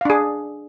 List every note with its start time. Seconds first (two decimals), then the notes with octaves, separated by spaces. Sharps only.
0.01 F5
0.05 D4
0.10 G#4